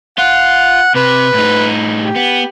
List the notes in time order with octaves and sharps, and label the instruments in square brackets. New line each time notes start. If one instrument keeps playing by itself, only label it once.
[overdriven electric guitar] F4 [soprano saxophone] F#5
[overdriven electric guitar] C3 [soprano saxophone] B4
[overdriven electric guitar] A2 D#4
[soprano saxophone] G4
[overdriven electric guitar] B3